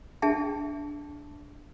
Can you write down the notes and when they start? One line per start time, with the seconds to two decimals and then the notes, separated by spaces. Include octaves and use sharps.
0.22 D4 G#4 E5 G5 A5